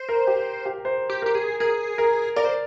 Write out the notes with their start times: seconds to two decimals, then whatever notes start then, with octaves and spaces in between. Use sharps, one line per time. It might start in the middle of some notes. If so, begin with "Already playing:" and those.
Already playing: C5
0.09 A#4
0.27 G4
0.65 G4
0.85 C5
1.10 G4
1.22 G4 A#4
1.35 G#4
1.60 G#4 A#4
1.98 A#4
2.36 A#4 D5
2.45 C5